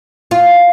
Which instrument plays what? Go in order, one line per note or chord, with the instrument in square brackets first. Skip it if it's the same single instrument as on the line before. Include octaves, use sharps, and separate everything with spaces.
[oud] F4